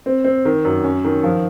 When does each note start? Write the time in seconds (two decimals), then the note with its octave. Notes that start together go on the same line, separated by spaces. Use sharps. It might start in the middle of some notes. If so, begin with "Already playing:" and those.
0.06 C4
0.24 C4
0.45 D#3
0.65 F#2
0.84 C#4
1.04 D#3
1.24 F3